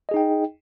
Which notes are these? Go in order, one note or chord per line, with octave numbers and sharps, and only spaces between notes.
D#4 G#4 D#5 G5